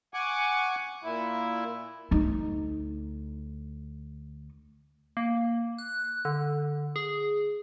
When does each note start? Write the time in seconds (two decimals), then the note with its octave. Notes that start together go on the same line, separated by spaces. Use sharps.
0.14 F#5 G#5 C#6 D6
1.04 A#2 E4
2.11 D2 D#4
5.17 A#3
5.78 F#6
6.25 D3
6.96 G#4